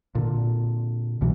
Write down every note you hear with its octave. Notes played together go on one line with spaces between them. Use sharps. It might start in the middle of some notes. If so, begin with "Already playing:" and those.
A#2 D3
C2 B2 E3 F#3